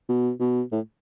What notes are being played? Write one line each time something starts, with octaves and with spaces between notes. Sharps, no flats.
B2
B2
A2